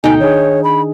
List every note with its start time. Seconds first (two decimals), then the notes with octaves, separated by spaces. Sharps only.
0.04 D2 B2 D#4 A4 G5 G#5
0.20 D#3 D4 G#4 C#5
0.64 B5